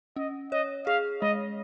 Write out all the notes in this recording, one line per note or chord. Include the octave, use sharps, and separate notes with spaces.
C#4 D#5
C#5 D#5
G#4 F5
G#3 D#5